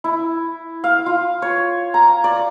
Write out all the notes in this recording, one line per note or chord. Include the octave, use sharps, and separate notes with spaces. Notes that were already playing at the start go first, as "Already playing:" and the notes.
E4
F5
F4
C#5
A#5
D5